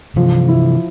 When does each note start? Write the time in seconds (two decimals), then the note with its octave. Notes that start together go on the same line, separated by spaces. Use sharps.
0.16 C3 E3 F3
0.48 E4